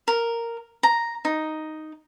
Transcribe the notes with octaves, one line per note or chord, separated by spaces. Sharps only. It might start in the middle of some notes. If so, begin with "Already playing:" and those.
A#4
A#5
D#4